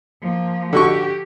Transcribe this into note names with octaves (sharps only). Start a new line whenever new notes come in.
F3 A#3
D3 F#4 G4 C#6